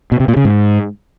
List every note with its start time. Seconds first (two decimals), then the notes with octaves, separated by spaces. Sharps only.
0.12 B2
0.20 C3
0.28 A#2
0.37 C#3
0.45 G#2